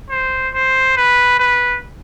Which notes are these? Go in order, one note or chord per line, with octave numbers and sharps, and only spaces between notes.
C5
C5
B4
B4